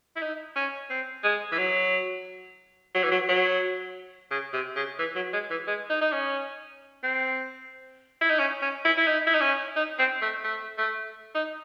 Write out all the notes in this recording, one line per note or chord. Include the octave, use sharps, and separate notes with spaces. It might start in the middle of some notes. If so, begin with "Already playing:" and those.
E4
D#4
C#4
C4
G#3
E3
F#3
F#3
E3
F#3
F#3
C#3
C3
C#3
E3
F#3
G#3
E3
G#3
D#4
D#4
C#4
C4
E4
D#4
C#4
C#4
E4
E4
D#4
E4
D#4
C#4
D#4
C4
A3
A3
A3
D#4